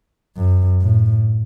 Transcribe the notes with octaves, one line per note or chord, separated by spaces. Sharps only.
F#2
A2